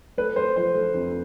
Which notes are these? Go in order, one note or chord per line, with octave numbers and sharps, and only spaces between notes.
A3 B4
A3 C5
F3 C5
A3
F2